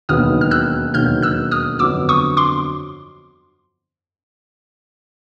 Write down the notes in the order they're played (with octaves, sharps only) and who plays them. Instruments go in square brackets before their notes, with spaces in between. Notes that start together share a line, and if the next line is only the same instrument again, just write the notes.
[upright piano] E1 D#2 D#3 F#3 B3 [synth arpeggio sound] D#6 F6
[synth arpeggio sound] F6
E6 F#6
[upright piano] E1 D#2 D#3 F#3 B3 [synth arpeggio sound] F6 G6
[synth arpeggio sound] E6 F#6
D#6 F6
[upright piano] G1 F2 D3 F#3 B3 [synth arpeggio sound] D6 E6
[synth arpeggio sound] C#6 D#6
C6 D6